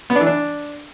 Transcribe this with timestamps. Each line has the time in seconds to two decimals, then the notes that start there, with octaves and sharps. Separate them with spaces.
0.10 B3
0.15 D4
0.21 E3
0.26 D4